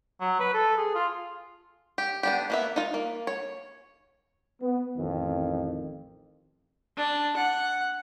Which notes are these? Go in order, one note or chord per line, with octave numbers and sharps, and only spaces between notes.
F#3
B4
A4
G#4
F4
G4
B3 D4 G4
A#3 B3 E5
D#4 F4
A#3
C#5
B3
A1 F2 D#3
D4
F#5